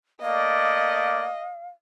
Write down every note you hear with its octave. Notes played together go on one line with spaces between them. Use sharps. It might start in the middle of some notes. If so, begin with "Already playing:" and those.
A3 A#3 D5 D#5 F5